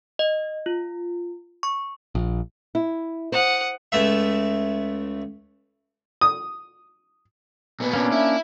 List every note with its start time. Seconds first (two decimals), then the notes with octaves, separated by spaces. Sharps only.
0.19 D#5
0.66 F4
1.63 C#6
2.15 A#1
2.75 E4
3.32 C5 F#5 D#6
3.92 C#2 A3 E5
6.21 D#6
7.80 A#2 B3
7.93 A#3 C#4 D4
8.12 E4